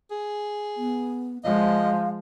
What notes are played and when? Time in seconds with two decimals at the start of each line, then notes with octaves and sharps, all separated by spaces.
0.11 G#4
0.77 B3
1.44 F3 G#3 D#5 F5